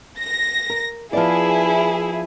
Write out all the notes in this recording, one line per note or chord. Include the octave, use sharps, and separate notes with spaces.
A#6
A#4
F3 B3 E4 G#4 D5